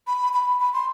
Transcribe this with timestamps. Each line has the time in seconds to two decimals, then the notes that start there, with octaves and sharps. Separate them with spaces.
0.07 B5
0.33 B5
0.59 B5
0.73 C6